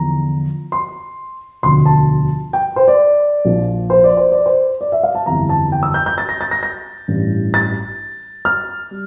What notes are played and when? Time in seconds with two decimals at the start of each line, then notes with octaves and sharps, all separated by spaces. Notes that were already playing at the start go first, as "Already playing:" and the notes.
Already playing: E2 D3 F3 A#5
0.72 C6
1.62 E1 D2 D3 F3 C6
1.86 A5
2.53 G5
2.76 C5
2.88 D5
3.45 A#1 A#2 F3
3.90 C5
4.04 D5
4.17 C5
4.32 D5
4.46 C5
4.81 D5
4.92 E5
5.03 F5
5.15 A5
5.26 G1 F2 E3 G3 A#5
5.49 A5
5.72 G5
5.83 E6
5.94 G6
6.06 G6
6.18 A6
6.29 A#6
6.41 A6
6.51 A#6
6.63 A#6
7.08 A1 G2 E3 G3
7.54 A6
8.45 F6
8.91 G3